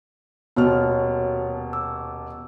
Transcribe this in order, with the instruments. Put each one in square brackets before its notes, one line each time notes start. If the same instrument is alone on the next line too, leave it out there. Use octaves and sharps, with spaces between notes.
[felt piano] D#1 B2 F6 [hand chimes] B3 F#4 C#5
[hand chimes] D6 E6